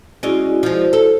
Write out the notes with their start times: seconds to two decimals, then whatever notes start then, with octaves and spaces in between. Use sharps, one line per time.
0.23 G#3 C#4 E4 F#4 D5
0.63 F3 G#3
0.93 A4